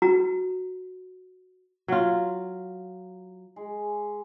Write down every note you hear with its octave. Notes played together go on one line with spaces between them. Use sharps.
F#4 A#5
F#3 F4
G#3